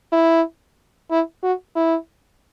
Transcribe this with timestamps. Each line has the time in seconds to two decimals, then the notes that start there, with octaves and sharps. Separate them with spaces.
0.12 E4
1.11 E4
1.43 F#4
1.76 E4